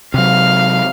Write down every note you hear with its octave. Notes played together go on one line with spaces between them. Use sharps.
C3 F#3 F5